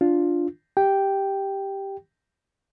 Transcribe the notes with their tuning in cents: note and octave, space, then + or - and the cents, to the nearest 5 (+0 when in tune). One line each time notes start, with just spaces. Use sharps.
D4 +0 F4 +0
G4 +0 G5 +0